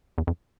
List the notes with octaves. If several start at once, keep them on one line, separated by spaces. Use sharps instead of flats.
E2
F2